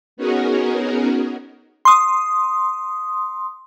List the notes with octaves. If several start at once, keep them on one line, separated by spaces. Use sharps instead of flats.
B3 C#4 D#4 F#4 G#4 A#4
C6 D#6